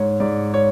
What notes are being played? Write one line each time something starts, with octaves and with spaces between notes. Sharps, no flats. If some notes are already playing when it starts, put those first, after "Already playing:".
Already playing: G#2 C#5
G#2 D5
C#5